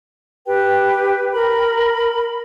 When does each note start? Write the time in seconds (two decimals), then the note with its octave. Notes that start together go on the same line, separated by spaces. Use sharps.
0.46 G4 B4 G5
1.33 A#4 B5